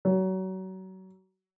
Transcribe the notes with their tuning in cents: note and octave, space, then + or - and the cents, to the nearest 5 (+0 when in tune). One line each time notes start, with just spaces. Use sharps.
F#3 +30